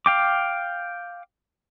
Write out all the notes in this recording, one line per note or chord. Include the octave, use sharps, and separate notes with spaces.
F5 G5 D6